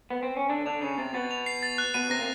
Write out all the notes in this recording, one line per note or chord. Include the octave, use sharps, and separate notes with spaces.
B3
C4
C#4
D3 D4 A6
D3 D4 F7
C#3 C#4 C7
C3 C4 A6
B2 B3 A6
F7
C7
A6
F#6
B2 B3 D#7
C3 C4 A#6
A#3